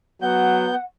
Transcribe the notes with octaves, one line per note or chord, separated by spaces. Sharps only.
F#3 B3 F#5 G6